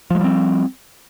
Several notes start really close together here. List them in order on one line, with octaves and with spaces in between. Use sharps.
F3 G#3 G3 C4